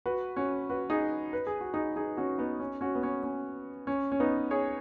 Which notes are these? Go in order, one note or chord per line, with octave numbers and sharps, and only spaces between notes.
F#4 B4
C#4 F#4
F#4 B4
D#4 G#4
B4
G#4
F#4
D#4 G#4
D#4 G#4
C#4 F#4
B3 D#4
C#4
C#4 F#4
B3
C#4
C#4
C#4
C#4
B3 D#4
G#4 C#5